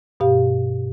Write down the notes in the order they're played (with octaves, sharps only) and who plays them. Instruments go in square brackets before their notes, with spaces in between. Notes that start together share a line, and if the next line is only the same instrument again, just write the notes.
[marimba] G2 B2 G4 F5